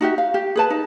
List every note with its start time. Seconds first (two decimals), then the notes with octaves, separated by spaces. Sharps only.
0.01 D#4 F#4 G4 E5
0.18 F5
0.34 G4
0.56 G#4 B4 A5
0.70 D#4